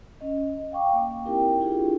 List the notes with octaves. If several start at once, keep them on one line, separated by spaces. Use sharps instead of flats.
C#4 D#5
F5 G5 C#6 D6
A#3
C4 D#4 E4 G4 A#4 G5
D4 E4 F4 G4 G#4